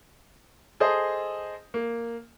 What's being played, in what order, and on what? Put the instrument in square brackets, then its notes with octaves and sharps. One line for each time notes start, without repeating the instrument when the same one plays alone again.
[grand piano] G#4 A4 C5 D#5
A#3